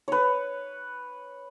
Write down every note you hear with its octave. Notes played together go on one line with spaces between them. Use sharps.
B4 C#5